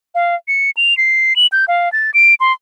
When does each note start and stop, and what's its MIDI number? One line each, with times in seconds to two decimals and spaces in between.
0.15 0.35 77
0.48 0.71 97
0.77 0.97 101
0.98 1.36 96
1.36 1.47 102
1.52 1.65 91
1.68 1.91 77
1.93 2.11 93
2.14 2.35 98
2.40 2.52 84